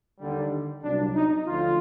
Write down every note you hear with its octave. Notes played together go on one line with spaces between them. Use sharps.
D#2 D3 G3
C2 A#2 F#3 D4
D#4
D2 D3 F3 F4